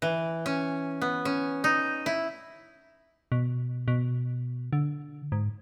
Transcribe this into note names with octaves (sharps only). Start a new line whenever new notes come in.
E3
C#4
B3
C#4
D#4
E4
B2
B2
D3
G#2